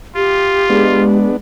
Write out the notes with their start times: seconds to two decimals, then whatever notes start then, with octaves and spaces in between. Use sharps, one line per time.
0.16 F4 G4
0.69 G#3 B3 D4